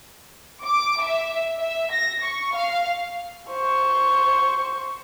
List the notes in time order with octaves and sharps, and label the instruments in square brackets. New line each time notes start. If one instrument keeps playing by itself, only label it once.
[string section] D6
E5
E5
A#6
C#6
F5
[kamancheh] C5 C#6